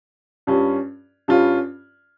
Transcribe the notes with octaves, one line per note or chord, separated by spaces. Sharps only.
G2 G3 C#4 F4
G2 G3 C#4 F4